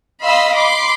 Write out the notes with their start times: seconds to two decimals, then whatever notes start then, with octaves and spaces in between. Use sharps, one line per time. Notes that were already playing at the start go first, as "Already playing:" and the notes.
0.23 D#5 F5 B5 C6 E6 B6
0.54 B5 C6 D6